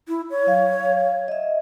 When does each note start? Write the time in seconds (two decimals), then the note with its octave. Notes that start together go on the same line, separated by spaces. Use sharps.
0.08 E4
0.30 C#5
0.47 F#3 F5
0.80 F5
1.28 D#5 E5